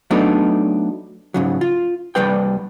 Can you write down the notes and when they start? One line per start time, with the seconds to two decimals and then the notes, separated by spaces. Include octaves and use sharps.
0.11 F#3 A3 B3 D4 D#4
1.34 G#2 C#3 F#3
1.61 F4
2.15 C2 G3 B4 G5